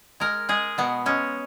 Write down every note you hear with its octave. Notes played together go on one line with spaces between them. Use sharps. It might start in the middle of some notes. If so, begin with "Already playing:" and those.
G#3 A#4
G#3 G#4
B2 B3
G#3 C#4